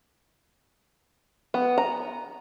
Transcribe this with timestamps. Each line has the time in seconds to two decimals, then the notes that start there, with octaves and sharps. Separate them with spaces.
1.54 B3
1.78 A#5